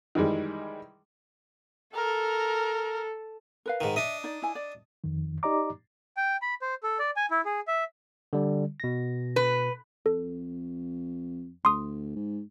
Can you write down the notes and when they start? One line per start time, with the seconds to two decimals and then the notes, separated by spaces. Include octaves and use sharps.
0.15 D#3 E3 G3 G#3
1.95 A4 A#4
3.66 A#4 B4 F5
3.81 G#2 D#3
3.96 D4 D#5 E5
4.24 D#4 D5
4.42 E4 G#5
4.55 D5
5.04 F2 D#3
5.43 D#4 G4 D5 D#5 A#5 D6
6.17 G5
6.42 B5
6.62 C5
6.83 A4
6.99 D5
7.16 G#5
7.31 E4
7.45 G#4
7.67 E5
8.33 D3 G3
8.80 B2 A#6
9.36 B4
10.06 F2 A4
11.65 D2 C6 D#6
12.16 G#2